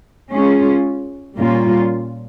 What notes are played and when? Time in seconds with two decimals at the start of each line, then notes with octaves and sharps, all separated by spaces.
0.31 G#3 C#4 F4 G#4
1.35 A#2 G3 A#3 C#4 F4